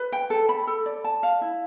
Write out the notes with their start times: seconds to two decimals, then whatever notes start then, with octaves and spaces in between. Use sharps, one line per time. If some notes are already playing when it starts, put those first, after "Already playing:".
Already playing: B4
0.12 G5
0.30 A4
0.49 B5
0.67 A4
0.86 D5
1.04 A5
1.23 F5
1.41 E4